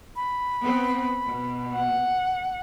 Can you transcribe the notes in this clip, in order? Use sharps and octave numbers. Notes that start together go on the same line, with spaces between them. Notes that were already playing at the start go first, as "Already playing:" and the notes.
B5
B3 C4
B2
F#5